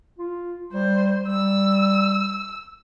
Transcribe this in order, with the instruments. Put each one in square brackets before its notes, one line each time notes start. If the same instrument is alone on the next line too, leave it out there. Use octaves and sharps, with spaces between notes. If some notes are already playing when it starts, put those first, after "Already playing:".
[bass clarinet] F4
[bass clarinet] G3 [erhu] C5
[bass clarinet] G3 [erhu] E6